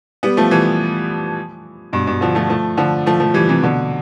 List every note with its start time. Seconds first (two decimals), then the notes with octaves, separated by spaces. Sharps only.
0.23 G3 B3
0.37 F3 A3
0.51 E3 G3
1.93 G2 B2
2.07 G2 B2
2.21 D3 F3
2.35 F3 A3
2.50 F3 A3
2.77 D3 F3
3.06 F3 A3
3.20 F3 A3
3.34 E3 G3
3.49 C3 E3
3.62 B2 D3